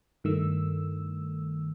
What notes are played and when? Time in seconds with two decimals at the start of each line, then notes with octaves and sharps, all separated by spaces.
0.24 G2 D#3 A3 E6